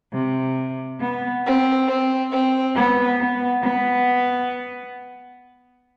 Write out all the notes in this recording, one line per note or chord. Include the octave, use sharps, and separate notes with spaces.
C3
B3
C4
C4
C4
B3
B3
B3